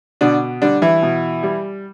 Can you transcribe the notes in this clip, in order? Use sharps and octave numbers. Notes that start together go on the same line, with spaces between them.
B2 D3 D4
D3 G3 D4
E3 E4
B2
G3